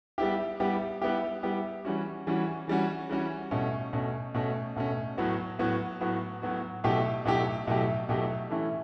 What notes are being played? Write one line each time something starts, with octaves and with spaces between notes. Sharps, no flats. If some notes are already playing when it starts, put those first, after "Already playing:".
G3 B3 E4 G4
G3 B3 E4 G4
G3 B3 E4 G4
G3 B3 E4 G4
E3 G3 C#4 F#4
E3 G3 C#4 F#4
E3 G3 C#4 F#4
E3 G3 C#4 F#4
B2 A3 C#4
B2 A3 C#4
B2 A3 C#4
B2 A3 C#4
A2 F#3 B3 F#4
A2 F#3 B3 F#4
A2 F#3 B3 F#4
A2 F#3 B3 F#4
B2 F#3 A3 E4 G4
B2 F#3 A3 E4 G4
B2 F#3 A3 E4 G4
B2 F#3 A3 E4 G4
E3 A3 C#4 E4